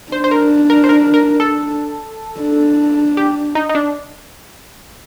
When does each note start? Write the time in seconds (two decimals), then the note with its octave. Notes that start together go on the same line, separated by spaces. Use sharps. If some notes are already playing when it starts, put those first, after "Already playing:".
0.12 D4 C5
0.24 C5
0.31 A#4
0.70 A#4
0.84 C5
0.89 A#4
1.14 A#4
1.40 A4
2.41 D4
3.17 G4
3.55 D#4
3.69 D#4
3.75 D4